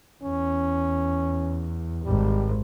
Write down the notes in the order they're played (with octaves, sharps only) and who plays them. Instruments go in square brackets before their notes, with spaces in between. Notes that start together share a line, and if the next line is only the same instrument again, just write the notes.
[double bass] E2 [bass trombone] C#4
[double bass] G#1 [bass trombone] G3